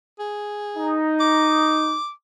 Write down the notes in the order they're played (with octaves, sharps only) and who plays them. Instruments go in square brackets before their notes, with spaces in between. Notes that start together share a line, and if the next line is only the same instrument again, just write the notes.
[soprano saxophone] G#4
[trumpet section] D#4
[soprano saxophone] D6